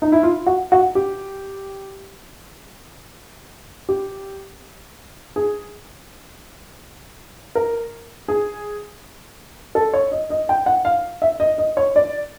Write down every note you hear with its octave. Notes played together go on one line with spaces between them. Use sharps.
D#4
E4
F4
F#4
F#4
G4
G4
G#4
A#4
G#4
A4
C#5
D#5
D#5
G5
F#5
F5
E5
D#5
D#5
C#5
D5